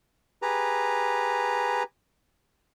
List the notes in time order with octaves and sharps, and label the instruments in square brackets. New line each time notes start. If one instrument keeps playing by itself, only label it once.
[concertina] G4 G#4 B4 A#5